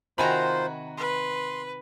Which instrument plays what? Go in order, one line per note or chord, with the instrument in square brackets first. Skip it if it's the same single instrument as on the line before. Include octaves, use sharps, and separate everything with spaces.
[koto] C3 D#3 A#5 [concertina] F4 C5 [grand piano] F#4 G#5 B5
[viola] B4 [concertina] C6